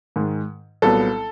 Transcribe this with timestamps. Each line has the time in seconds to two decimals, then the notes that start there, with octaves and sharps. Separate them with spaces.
0.16 G#2 D#3 G#3
0.82 C2 A#2 F#3 B3 A4